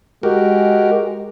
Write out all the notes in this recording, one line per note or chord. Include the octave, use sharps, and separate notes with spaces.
G#3 F#4 G4 A#4